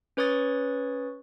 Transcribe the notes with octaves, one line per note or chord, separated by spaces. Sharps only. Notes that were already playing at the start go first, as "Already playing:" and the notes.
C#4 B4 C#5 C#6 D#6 A6